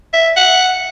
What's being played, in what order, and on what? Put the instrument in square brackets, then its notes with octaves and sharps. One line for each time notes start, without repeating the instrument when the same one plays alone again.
[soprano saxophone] E5
F#5